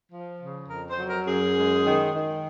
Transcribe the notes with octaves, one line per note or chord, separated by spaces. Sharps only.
F3
C#3
F2 A#4
C5
F#3
A#4
F#2 G#4
G#3
D#3
D#3